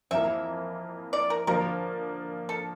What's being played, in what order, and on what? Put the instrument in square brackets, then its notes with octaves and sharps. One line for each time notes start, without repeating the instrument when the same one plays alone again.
[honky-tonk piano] F2 E3 A#3 [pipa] E5
[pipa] D5
A#4
[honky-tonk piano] D3 F3 A#3 D4 [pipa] A#4
[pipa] A4